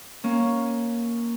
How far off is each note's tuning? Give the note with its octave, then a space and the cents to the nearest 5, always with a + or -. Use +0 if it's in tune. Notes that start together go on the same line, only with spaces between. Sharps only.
A#3 +5 C#4 +0